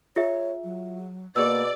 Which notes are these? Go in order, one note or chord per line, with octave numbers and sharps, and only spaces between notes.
F4 G#4 C#5 E5
F#3
B2 A#3 G#4 D5 E6